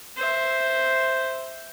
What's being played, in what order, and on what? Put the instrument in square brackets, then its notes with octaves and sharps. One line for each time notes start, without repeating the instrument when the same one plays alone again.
[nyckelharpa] C5 E5